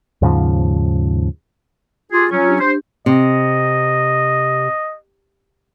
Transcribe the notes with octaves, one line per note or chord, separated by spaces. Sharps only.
D#2 G#2 C#3 F3
F4 G4 G#4
F#3 C#4 F4
D4 G4
C5
C3 D#5